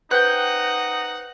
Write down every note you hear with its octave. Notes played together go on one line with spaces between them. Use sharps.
D#4 B4 C5 F#5 G5 F#6